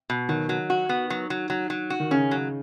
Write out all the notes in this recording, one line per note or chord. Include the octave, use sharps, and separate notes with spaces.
B2
D#3 F#3
F#3
F#4
B3
F#3
F#3
F#3
F#3
F#4
D#3
C#3 C#4
F#3